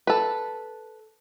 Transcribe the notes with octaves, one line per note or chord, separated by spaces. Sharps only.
A4 B4